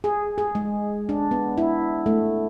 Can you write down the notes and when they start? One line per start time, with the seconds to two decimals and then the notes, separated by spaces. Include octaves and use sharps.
0.04 G#4
0.38 G#4
0.55 G#3
1.09 D4
1.31 B3
1.58 E4
2.06 A3